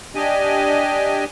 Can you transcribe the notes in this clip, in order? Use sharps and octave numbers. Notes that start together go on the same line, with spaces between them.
D4 G4 D#5 G#5